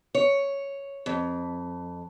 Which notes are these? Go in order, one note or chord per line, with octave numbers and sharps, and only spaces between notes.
C#5
F2